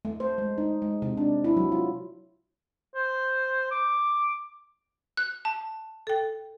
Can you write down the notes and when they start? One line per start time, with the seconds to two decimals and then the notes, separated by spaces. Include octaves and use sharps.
0.05 A3
0.20 C5
0.38 G#3
0.58 D#4
0.82 G#3
1.02 C3
1.17 D4
1.44 E4
1.57 F#3
1.72 F4
2.95 C5
3.71 D6
5.17 F#6
5.45 A5
6.07 A4 G5